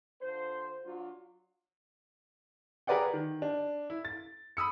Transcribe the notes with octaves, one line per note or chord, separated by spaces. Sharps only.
D3 F4 C5
F#3 D4 F4
G#4 A#4 B4 D5 F#5 G5
D#3
D4
E4
A6
B5 D#6 E6 C#7